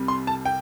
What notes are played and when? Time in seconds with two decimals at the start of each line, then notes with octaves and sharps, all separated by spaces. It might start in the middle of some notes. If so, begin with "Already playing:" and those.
Already playing: C2 C3 G3
0.08 C6
0.27 A5
0.45 G5